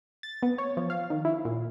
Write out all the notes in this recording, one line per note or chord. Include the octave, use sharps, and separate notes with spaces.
A6
B3
C#5
F3
F5
D#3
E4
A#2